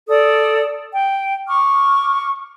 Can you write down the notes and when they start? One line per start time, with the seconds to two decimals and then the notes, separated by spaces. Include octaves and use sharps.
0.09 A4 D5 D#6
0.93 G5
1.48 C#6 D6 F6